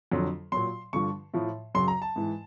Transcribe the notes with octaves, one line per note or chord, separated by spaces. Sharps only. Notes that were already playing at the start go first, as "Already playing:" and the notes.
F2 D3 F#3
A#2 F#3 C6
G2 D3 F3 C#6
A2 F3
F#2 C#3 F#3 C6
A#5
A5
G#2 E3